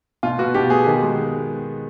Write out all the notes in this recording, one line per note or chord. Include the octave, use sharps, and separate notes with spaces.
B2 F4
B3 F#4
B2 G4
B3 G#4
D#3
G#3